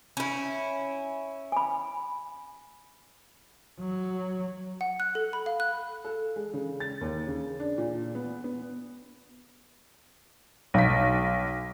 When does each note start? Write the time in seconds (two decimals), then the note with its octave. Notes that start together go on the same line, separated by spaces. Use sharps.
0.17 C#4 E4
1.52 G#5 B5
3.79 F#3
4.81 F#5
5.00 F#6
5.15 A4
5.33 B5
5.46 F5
5.60 F#6
6.05 A4
6.36 G#3
6.54 C#3
6.80 A6
7.01 D#2
7.27 C#3
7.60 D4
7.78 A#2
8.15 B3
8.44 B3
10.74 B1 B6